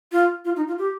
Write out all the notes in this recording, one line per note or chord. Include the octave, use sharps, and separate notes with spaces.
F4
F4
D#4
F4
G4